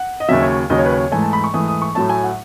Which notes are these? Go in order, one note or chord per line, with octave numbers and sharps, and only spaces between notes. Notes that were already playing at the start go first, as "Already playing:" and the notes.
Already playing: F#5
D#5
D#2 C#3 F#3 E5
C#5
D#2 C#3 F#3 D#5
C#5
B4
C#5
G#2 E3 A3 G#5
A5
B5
C#6
G#2 E3 A3 D#6
D#6
C#6
A2 F#3 A3 A5
G#5
F#5